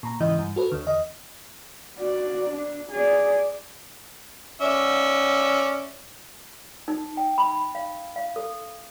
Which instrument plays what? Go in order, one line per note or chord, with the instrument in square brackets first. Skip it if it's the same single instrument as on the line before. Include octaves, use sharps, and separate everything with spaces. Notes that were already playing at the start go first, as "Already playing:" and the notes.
[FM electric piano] A#2 A#5
G#2 C#3 E3 E4 D#5
G2
F#4 A4 B4
D2 D3
E2 D#5
[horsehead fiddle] F#4 D5
D4
G#4 D5
[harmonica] C#4 D5 E5
[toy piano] D#4
G5
B5
F5
F5
A4